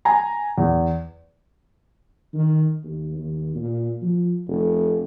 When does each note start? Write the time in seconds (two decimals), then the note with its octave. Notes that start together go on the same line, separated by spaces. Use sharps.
0.05 G#5 A#5
0.58 E2
2.34 D#3
2.84 D#2
3.18 D#2
3.55 A#2
4.02 F3
4.48 F1